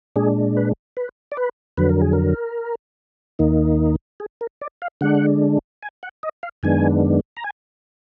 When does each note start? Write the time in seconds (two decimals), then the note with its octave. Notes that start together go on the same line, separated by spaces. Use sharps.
0.16 A#2 G#3 D4 G#4
0.57 B4
0.97 B4
1.32 D5
1.37 B4
1.77 F2 D3 F#3 B4
1.89 A#4
2.01 G#4
2.13 A#4
3.39 D#2 D#3 A#3 D#4
4.20 G#4
4.41 A#4
4.61 D5
4.82 F5
5.01 D3 G#3 D4 F#5
5.83 G#5
6.03 F#5
6.23 D#5
6.43 F5
6.63 F#2 D#3 G#3 B3 D4 G#5
7.37 A#5
7.44 G#5